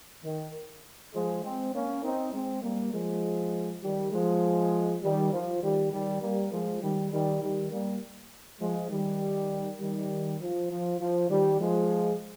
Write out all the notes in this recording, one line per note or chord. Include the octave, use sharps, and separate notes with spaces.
D#3
F3 G#3
G#3 C4
A#3 C#4
C4 D#4
G#3 C4
G3 A#3
F3 G#3
D#3 G3
F3 G#3
D#3 G3
F3
D#3 G3
D#3 G3
G3 A#3
F3 G#3
D#3 G3
D#3 G3
D#3 G3
G3 A#3
F3 G#3
D#3 G3
D#3 G3
F3
F3
F3
D#3 G3
F3 G#3